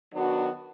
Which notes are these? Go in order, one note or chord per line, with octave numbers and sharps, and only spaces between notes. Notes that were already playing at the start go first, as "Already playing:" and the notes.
D#3 F#3 B3 D4 F#4